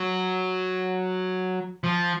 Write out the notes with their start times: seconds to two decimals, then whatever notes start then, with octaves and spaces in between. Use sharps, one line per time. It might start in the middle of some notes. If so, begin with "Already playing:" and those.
Already playing: F#3
1.84 F3